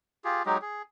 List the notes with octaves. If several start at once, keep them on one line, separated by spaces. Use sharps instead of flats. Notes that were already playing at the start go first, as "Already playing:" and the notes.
F4 G4 G#4
F#3 G#3 D#4 G4
G#4